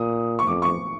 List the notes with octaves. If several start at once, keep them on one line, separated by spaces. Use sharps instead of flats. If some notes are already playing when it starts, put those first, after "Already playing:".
Already playing: A#2 D#6
C#6
F2 D6
C#6